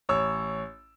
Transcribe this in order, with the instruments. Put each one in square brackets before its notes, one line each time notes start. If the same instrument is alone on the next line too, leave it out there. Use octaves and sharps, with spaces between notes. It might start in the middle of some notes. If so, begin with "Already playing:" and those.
[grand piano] A1 C#5 E6